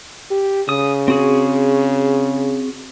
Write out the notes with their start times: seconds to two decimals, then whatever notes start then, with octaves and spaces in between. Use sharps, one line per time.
0.31 G4
0.69 C#3 D#6
1.08 C4 F#4 G#4